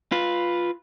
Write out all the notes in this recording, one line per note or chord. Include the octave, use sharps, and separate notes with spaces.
F4 B4